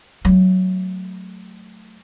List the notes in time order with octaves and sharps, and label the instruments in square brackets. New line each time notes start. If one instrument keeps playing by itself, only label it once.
[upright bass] F#3 A3